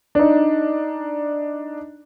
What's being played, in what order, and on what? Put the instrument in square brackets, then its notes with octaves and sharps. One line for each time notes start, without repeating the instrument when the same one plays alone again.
[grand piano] D4 D#4